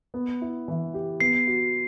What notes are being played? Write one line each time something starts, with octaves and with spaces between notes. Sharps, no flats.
B3
E4
E3
G4
B3 C7
F#4